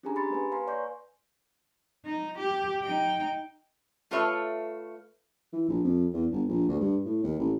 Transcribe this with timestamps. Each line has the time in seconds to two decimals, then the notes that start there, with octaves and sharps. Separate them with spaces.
0.03 C#4 D4 G4 G#4 G#5 A#5
0.16 G4 B5 C6 A6 C#7
0.31 A#3 B4 G#5
0.52 B4 F5 G#5 A#5 C6
0.67 C#5 D5 C6 C#6 G6 A#6
2.05 D#4
2.38 G4
2.83 D#4 G5
4.11 A3 F4 A4 B4 C#5 E5
5.53 E3
5.68 A#1
5.83 F2
6.13 E2
6.32 G1
6.49 A#1
6.69 D2
6.80 G2
7.05 A2
7.23 D#2
7.39 A1